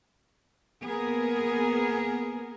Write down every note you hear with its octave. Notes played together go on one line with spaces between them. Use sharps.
A#3 B3 G#4 A#4